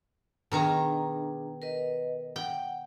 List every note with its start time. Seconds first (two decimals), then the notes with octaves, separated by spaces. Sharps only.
0.52 B2 D#3 D4 G#4 A#5
1.62 A#4 B4 D#5
2.36 F#5 G5